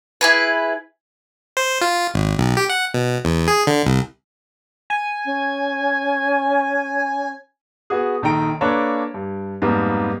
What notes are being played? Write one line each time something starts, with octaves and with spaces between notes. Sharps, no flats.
E4 G#4 B4
C5
F4
G#1
B1
G4
F#5
B2
E2
G#4
D3
C2
G#5
C#4
B3 F#4 G#4
A#1 D#3 A4 G5 A#5 D7
A#3 D4 A4 B4 C#5 A#5
G2
F2 G#2 G3 A#3 B3